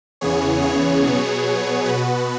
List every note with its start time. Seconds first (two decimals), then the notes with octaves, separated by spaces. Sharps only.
0.21 E2 C#3 E3 B3 G#4 C#5
0.62 G#4 C#5
1.03 B2 F#3 B3
1.85 B2 B3 F#4 B4